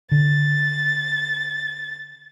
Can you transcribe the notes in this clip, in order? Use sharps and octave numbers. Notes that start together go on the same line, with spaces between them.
D3 A6